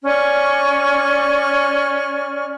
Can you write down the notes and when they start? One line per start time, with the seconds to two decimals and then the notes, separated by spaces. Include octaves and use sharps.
0.04 C#4 D5 C#6 F6